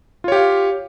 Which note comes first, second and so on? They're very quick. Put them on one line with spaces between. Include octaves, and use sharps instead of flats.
F4 C#5 G4 F5